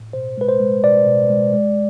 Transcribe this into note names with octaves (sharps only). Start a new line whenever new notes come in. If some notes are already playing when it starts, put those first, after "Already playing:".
Already playing: A2
B2 C5
G#3 B4
C5
G#3
B2 D5
B2
G#3
G#3